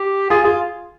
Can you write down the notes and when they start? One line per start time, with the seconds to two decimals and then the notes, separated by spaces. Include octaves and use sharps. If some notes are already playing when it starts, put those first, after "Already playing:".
Already playing: G4
0.30 F4 G#4
0.44 F4 G#4